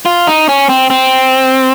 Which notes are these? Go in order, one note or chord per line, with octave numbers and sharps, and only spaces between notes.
F4
D#4
C#4
C4
C4